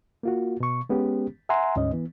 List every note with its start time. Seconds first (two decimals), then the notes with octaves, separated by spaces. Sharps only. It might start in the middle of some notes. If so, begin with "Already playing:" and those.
0.23 A#3 F4 F#4
0.60 B2 C#6
0.89 G#3 B3 C#4 G4
1.49 E5 F#5 G#5 A#5 C6
1.76 D2 G#2 C#4 D#5
1.92 E3 B3